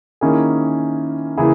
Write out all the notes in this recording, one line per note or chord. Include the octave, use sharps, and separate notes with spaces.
D#3 A#3 C#4 E4 G#4
C#3 E3 A#3 E4 G#4